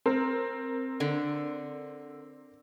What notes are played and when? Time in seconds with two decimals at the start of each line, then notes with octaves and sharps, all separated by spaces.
0.06 C4 A#4
1.00 D3